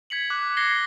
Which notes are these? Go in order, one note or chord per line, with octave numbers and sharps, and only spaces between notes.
G#6 B6 C#7 F#7
D6 F#6
G#6 A#6 C7 C#7 G7